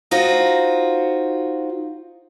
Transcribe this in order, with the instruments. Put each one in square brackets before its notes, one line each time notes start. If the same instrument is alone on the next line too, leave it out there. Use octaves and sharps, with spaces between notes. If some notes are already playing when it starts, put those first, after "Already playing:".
[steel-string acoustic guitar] D#4 F4 F#4 C5